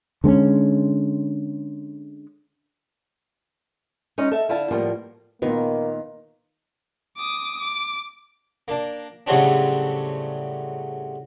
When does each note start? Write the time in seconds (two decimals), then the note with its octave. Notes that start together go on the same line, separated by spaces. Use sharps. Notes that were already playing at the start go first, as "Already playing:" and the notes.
0.24 D3 G#3 C4 C#4
4.18 G#3 C#4 D#4
4.31 A4 E5 A5
4.49 D3 E4 F5 A5
4.71 A2 F3 G3 A#3 B3
5.42 A#2 D#3 A#3 B3
7.17 D6 D#6
7.60 D6
8.68 A#3 D4
9.27 A2 C#3 F#3 G3 C4 D4